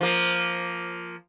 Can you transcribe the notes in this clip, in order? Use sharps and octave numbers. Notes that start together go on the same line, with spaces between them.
F3 A#3